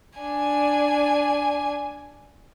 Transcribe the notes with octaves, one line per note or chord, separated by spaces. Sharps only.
D4 G#5